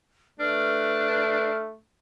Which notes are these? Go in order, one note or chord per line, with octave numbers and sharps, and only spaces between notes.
A3 D4 B4 F6